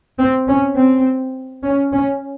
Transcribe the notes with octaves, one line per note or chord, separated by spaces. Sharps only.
C4
C#4
C4
C#4
C#4